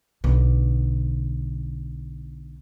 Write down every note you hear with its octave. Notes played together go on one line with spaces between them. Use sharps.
B1 D3